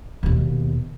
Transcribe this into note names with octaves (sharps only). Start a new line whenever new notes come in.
D#2 B2